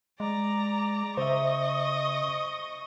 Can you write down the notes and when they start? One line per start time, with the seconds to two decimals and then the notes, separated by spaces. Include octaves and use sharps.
0.20 G#3 D5 A#5
1.17 C#3 C5 D#5 E5 C#6